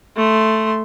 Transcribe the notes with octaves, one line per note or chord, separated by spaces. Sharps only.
A3 C6